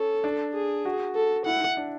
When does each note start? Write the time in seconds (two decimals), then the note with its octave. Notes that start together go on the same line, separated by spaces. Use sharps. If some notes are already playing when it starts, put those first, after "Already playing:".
Already playing: C#4 A4
0.24 D4
0.55 G#4
0.85 F#4
1.15 A4
1.46 E4 F#5
1.61 E4
1.77 D4